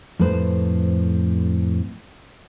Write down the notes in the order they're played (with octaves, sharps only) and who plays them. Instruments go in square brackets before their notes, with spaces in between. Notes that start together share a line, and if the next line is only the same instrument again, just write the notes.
[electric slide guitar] F2 A2 A3 B4 C5